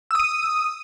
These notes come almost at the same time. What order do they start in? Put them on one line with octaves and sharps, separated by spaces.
E6 D#6 D#7